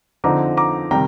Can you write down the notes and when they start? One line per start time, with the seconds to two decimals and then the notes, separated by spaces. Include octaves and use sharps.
0.24 D3 F3 C4 D#4 A#5 D6
0.57 A#5 D6
0.91 C3 D#3 G3 G5 A#5